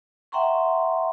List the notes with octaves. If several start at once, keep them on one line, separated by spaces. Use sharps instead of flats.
E5 F#5 G5 A#5 C6 C#6